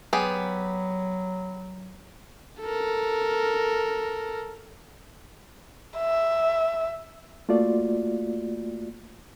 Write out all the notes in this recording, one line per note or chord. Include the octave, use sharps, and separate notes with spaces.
F#3 B3 G4 G#4
A4 A#4
E5
A3 A#3 F4 F#4 D5